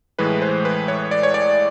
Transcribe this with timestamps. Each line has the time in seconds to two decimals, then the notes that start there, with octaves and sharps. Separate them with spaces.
0.19 A2 E3 G#3 B4
0.42 C5
0.65 B4
0.88 C#5
1.11 D5
1.23 C#5
1.34 D5